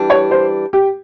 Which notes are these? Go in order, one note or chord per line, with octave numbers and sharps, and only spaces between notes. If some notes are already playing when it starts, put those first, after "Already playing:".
Already playing: E3 G3 D4
C#5
C5
G4